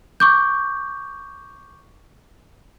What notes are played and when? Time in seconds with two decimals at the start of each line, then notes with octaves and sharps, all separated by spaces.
0.20 C#6 D6 G6